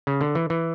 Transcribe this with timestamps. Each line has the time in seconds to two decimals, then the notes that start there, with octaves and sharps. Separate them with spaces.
0.07 C#3
0.21 D3
0.35 E3
0.50 E3